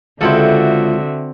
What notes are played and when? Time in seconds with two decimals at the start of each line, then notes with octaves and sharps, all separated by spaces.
0.21 C#2 D3 C4 E4 F#4 A4 E5